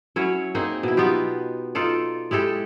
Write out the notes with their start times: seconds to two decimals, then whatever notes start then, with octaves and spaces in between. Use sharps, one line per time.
0.16 F#3 C#4 E4 C#5
0.55 A#3 C4 D#4 G#4
0.83 B2 E4
0.97 B3 D#4 F4 G4
1.75 D#4 F4 A4 D5
2.31 G#3 E4 G4 A4